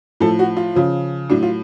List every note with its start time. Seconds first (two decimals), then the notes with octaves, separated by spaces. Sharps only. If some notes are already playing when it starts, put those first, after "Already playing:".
0.20 A2 F3 A4
0.39 F#4
0.57 F4
0.76 C#3 F3
1.30 A2 F#3 D4
1.43 F4